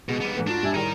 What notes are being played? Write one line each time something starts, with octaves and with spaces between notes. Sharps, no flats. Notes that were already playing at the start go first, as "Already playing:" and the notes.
B2 G#3
G3 B3
G#2 E3 A3
D4 F4 F#4
G2 G3 E5 G#5
A2 D#3 G3 D#4 G#4 A#4